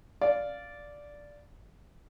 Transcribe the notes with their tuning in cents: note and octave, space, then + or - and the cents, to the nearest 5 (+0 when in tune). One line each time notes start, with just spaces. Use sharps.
D5 -5 F5 +0